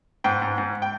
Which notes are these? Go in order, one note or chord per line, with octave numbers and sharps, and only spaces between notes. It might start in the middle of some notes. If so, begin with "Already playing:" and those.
G#2 G5
G#2
G#2
G5